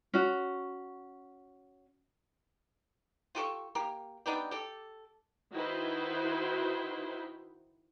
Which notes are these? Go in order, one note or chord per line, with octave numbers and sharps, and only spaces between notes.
C#4 F#4
F4 G4 A4 C#6
A#3 G4
B3 D4 D#4 G4
G4 A4
D#3 D#4 E4 F#4 B4 C5